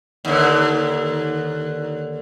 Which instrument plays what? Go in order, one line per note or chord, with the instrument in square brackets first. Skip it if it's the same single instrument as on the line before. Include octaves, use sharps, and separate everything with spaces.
[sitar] D#2 D3